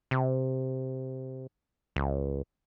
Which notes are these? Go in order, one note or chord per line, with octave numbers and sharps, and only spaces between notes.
C3
C#2